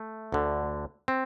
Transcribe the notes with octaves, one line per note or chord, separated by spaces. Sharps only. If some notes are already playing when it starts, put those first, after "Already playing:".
Already playing: A3
D2 D3
C4